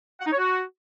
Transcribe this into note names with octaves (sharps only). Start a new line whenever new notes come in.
F#5
D#4
C#5
F#4